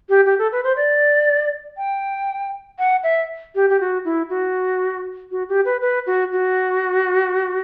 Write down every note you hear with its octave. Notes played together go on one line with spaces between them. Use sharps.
G4
G4
A4
B4
C5
D5
G5
F#5
E5
G4
G4
F#4
E4
F#4
F#4
G4
B4
B4
F#4
F#4